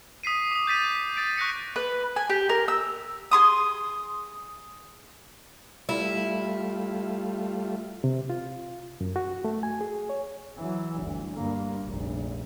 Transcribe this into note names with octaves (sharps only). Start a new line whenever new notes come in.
D#6 B6 C7 D#7
D6 D#6
G6 A6 B6 D#7
D#6 A6 D7
C#6 F#6 G6 A#6 C#7
B4
G#5
G4
A#4
E6
G#4 C6 D#6
G3 A3 E4 F4
C3
F4
F#2
F#4
A3
G#5
G#4
C#5
E3 F#3
G1 D2
G2 A#3
F1 A#1